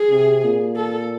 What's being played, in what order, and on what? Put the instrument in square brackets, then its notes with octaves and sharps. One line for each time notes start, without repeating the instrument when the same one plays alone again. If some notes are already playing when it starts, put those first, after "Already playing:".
Already playing: [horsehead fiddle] G#4
[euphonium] C3
A#2
[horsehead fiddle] A4